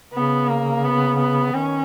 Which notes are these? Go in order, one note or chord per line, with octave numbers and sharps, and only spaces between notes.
C#3 B3
A#3
B3
B3
D#3 C#4